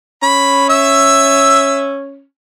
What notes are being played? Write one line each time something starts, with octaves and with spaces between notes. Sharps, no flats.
C#4 B5
E5 E6